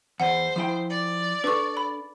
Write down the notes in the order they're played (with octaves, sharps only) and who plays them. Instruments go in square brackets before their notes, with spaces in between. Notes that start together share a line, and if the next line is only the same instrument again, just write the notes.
[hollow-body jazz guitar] E2 [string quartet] C5 [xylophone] F#5
[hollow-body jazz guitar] F3 E4 G5
[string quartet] D5
[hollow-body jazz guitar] D4 A4 [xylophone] B4 C#6
[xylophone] B5